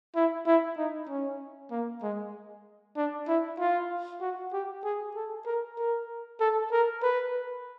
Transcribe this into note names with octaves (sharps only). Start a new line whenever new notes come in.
E4
E4
D#4
C#4
A#3
G#3
D4
E4
F4
F#4
G4
G#4
A4
A#4
A#4
A4
A#4
B4